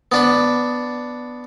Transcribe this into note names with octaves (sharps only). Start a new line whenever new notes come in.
B3 D4 B5